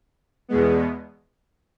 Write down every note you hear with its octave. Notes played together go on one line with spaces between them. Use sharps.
E2 B2 G#3 B3